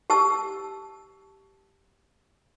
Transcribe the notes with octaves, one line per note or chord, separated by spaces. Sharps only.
G4 A5 E6